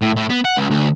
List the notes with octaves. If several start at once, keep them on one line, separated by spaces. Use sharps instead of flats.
A2
A2
B3
F#5
C#2
D2